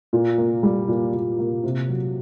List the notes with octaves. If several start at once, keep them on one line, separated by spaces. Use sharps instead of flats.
A#2
A#3
G3
A#2
A#2
A#3
C3
F#3